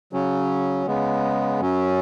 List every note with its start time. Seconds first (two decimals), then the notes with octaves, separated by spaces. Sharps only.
0.13 C#3 F#3 C#4
0.87 C#3 G#3 B3
1.60 F#2 F#3 C#4